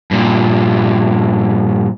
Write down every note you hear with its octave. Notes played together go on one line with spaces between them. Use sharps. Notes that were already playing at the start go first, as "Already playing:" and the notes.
G2 A#2